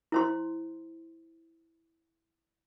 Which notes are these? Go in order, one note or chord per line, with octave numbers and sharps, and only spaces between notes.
E4 C5 C6